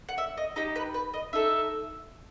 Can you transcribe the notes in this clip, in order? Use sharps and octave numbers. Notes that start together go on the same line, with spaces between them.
F#5
E5
D#5
D#4 G4 D#5
B4
B4
D#5
D#4 A4 E5